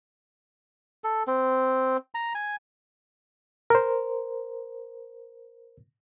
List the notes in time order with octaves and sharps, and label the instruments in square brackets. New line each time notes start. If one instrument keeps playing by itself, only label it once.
[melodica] A4
C4
A#5
G#5
[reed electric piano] A#4 C5